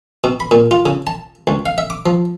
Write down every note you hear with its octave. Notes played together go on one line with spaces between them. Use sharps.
B2
B5
A#2
F4
C#3
A5
C#2
F5
E5
D6
F3